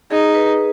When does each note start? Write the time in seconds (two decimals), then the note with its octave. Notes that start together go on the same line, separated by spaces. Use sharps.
0.11 D#4 G#4
0.35 B4